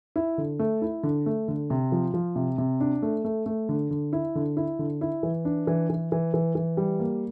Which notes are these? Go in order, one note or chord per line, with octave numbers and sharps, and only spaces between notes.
E4
D3
A3
E4
D3
A3
D3
C3
F3
F3
C3
C3
D4
A3
A3
A3
D3
D3
E4
D3
E4
D3
E4
E3
D4
E3
E3
E3
E3
E3
G3
A#3